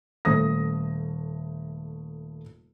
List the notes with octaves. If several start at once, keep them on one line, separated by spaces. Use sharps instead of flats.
D#1 A3 D#6 A#6